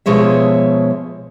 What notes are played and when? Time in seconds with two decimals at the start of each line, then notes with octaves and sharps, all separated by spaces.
0.06 B2 F3 G#3 C#5 E5